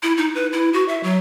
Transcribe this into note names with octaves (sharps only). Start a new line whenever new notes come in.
E4
D#4
B4
E4
F#4
E5
F#3